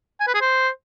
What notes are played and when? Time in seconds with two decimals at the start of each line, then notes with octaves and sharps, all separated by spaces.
0.20 G#5
0.27 B4
0.34 G#4
0.41 C5